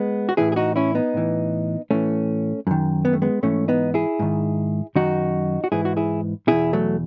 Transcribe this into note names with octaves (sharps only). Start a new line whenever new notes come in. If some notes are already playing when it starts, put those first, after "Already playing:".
Already playing: G#3 B3
F#4
A2 E3 E4 G#4
G#4
D#4 F#4
C#4 E4
B3 D#4
A2 E3
A2 E3 A3 C#4
F#2 D#3
B3
A3
G#3 B3
G#2 E3 A3 C#4
B3 D#4
E4 G#4
G#2 D#3
F#2 D#3 D#4 F#4
F#4
G#2 E3 E4 G#4
F#4
E4 G#4
E2 B2 E4 G#4
F#3 A3